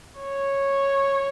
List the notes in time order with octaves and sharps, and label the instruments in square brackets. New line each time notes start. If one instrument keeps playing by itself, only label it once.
[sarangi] C#5